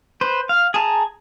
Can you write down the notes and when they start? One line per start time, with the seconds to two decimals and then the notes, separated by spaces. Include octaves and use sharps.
0.21 B4 C5
0.49 F5
0.74 G#4 A5 A#5